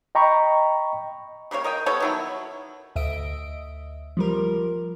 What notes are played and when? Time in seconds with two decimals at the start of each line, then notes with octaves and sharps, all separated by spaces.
0.15 D#5 G5 A#5 B5 C#6
1.51 C#3 G3 A#3 C#5
1.64 A#4 D#5 G5
1.86 G3 B3 A4 C#5
2.00 D#3 F#3 E4
2.96 D2 D#5 E5 D7
4.17 F3 G3 A#4